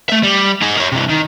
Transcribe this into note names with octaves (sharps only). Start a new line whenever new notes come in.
A3 E5
G3
D#4 G#4
A#4 C#5
C3 E3
D#3